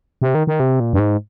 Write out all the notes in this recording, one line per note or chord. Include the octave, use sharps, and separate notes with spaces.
C3
D#3
D#3
C3
A#2
G2
G#2